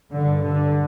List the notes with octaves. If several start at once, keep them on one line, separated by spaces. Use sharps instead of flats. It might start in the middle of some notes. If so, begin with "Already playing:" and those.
G2 D3
D3